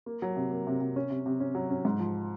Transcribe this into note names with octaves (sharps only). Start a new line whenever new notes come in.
A#3
F#3
C3
A#3
C3
C3
C#4
C3
C3
C#4
F#3
C#4
G#2
F3